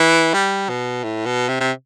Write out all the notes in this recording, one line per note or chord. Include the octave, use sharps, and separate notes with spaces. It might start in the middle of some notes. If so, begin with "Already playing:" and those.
Already playing: E3
G3
B2
A2
B2
C3
C3